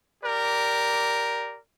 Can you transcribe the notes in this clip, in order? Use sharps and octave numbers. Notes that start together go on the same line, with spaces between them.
G4 A#4 D5